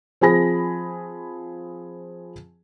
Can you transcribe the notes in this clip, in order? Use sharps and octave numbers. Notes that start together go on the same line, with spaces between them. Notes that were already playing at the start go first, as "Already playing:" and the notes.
F3 C4 G#4 G#5 B5 A#6